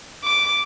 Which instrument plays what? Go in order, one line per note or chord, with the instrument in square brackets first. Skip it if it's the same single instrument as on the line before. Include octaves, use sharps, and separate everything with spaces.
[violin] D6